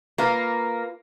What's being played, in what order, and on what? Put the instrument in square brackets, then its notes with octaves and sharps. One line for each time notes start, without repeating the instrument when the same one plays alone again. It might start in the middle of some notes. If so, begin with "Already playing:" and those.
[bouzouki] A#3 [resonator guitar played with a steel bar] F4 B4 F5